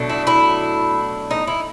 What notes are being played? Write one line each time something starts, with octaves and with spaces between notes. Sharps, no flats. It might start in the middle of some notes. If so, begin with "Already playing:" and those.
Already playing: B2 F#3 A3 D4
E4
E4
D#4
E4